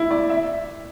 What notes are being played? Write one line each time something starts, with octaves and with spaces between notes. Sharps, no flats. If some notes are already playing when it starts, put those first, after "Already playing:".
Already playing: E4
D5
E5